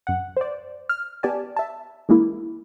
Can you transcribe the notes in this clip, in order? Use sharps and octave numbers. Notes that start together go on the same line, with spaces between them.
F#2 F#5
C5 D5
F6
B3 G4 D5 G#5 A5
E5 A5
E3 G#3 A#3 E4